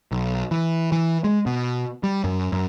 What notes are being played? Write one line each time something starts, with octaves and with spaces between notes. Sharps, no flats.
B1
E3
E3
G#3
B2
G3
F#2
F#2